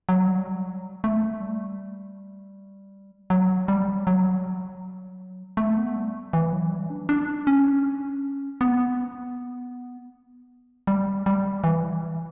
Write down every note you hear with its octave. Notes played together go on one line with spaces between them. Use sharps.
F#3
G3
A3
G3
F#3
G3
F#3
A3
B3
G3
E3
F#3
G3
D4
D4
C#4
B3
G3
G3
E3